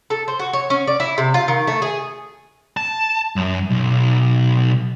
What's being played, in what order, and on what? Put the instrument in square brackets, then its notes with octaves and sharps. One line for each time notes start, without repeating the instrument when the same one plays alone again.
[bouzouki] A4
C5
F#4
C#5
C#4
D5
E4
C3
F4
D#3
A3
G#4
[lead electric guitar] A5
F#2
B1